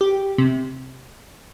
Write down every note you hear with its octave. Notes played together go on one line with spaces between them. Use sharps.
G4
C3